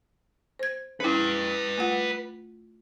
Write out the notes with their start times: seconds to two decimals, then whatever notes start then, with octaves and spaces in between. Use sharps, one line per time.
0.59 C5 G#6
1.00 C#4 E4 B4 G5
1.78 A3 F4 F#5